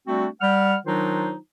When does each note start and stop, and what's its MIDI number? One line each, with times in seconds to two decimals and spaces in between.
0.07 0.28 55
0.07 0.28 57
0.07 0.28 60
0.07 0.28 62
0.07 0.28 66
0.41 0.75 55
0.41 0.75 78
0.41 0.75 89
0.86 1.36 51
0.86 1.36 54
0.86 1.36 62
0.86 1.36 63
0.86 1.36 65
0.86 1.36 72